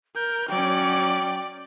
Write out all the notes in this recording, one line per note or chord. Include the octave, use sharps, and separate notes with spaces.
A#4 G6
F#3 C#4 D5 G5